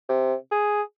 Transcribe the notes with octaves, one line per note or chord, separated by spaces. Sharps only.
C3
G#4